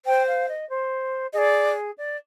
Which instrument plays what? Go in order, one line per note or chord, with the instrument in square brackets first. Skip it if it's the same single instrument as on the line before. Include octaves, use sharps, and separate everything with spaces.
[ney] C5 [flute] G5
[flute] F5
D#5
C5
[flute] G#4 [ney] D5 D#5
[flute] D5